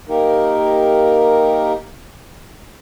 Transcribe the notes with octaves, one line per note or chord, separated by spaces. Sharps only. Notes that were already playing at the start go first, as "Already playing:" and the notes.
A#3 D#4 G4 A#4